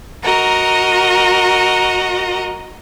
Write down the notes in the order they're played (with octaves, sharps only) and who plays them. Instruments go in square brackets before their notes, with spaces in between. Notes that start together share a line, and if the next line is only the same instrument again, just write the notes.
[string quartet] F#4 A#4 D#5 A#5